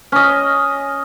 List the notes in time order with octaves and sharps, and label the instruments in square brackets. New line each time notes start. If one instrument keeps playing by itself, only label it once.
[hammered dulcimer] C#4 D#5